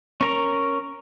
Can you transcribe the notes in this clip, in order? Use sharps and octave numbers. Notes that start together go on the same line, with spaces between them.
C#4 A#4 A#5